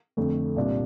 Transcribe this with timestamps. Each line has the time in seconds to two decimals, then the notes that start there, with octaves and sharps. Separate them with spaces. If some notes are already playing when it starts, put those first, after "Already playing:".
0.17 F2 D3 A3
0.56 C2 A#2 G3 D4